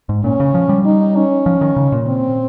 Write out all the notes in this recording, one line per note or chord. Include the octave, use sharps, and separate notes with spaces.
G#2
A#2 C#4
C#3
F3
G3
D#4
C#4
F3
D#3
C#3
A#2
C4